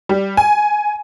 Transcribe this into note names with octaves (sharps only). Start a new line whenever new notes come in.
G3
G#5